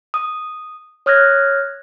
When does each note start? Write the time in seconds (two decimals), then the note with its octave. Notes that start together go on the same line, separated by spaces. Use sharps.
0.14 D#6
1.06 C#5 D#6 F6 F#6 G#6 A#6